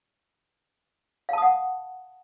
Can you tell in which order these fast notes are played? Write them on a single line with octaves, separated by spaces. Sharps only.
F5 A5 D#6 F#5